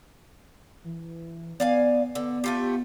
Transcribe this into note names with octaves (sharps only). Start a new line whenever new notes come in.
E3
B3 D5 F5 G#5
D3 B3
A3 F4 G4